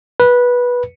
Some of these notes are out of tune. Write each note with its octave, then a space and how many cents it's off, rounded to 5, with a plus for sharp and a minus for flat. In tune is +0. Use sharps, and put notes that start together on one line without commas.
B4 -15